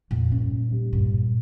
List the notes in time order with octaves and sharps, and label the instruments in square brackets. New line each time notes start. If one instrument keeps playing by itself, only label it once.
[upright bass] F2 [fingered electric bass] A#2
[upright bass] G2 [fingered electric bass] C#4
[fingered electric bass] A#2
G3
[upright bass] G2 [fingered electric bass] A#2
[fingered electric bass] A#2